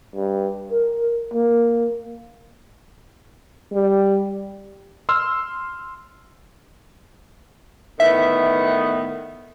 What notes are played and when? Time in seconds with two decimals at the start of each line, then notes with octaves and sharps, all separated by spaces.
0.15 G2
0.71 A#4
1.34 A#3
3.73 G3
5.09 C6 E6 F6
8.00 A2 D#3 B3 E5